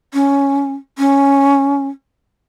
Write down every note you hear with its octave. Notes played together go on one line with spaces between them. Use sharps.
C#4
C#4